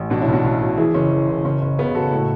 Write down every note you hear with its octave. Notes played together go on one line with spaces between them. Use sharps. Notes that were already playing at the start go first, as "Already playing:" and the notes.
Already playing: A1
B2 D4 F#4
C#4 E4
B1
D4 F#4
B1
B2
E3 E4 G#4
F#1 C#4
E3
F#1
F#1 C#4
F#1
C#3 B3
F#1 F#4 A4
A2